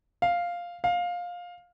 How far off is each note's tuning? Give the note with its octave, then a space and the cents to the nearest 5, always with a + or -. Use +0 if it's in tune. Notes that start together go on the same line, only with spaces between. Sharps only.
F5 +0
F5 +15